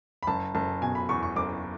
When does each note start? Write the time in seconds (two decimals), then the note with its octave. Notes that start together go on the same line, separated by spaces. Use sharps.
0.23 B5
0.27 F#1 A5
0.55 F#1 A5
0.82 B2 G#5
0.95 B5
1.09 E2 C#6
1.23 C#6
1.36 F#1 D6